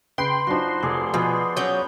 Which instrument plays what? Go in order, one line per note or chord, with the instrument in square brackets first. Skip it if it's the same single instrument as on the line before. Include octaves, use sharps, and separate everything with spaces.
[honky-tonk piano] C#3 G5 D7 [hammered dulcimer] B4 [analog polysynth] C6
[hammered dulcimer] F3 F#4 [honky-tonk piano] F#3 D4 D#4
[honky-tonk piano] F1 [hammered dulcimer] G#4 D5
[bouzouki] B2 [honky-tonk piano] F3 [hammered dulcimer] B3 G#4
[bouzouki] F#3 C#4 [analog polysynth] G6